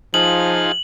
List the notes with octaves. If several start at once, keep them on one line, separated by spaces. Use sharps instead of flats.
F3 D#4 F4 G#4 F#7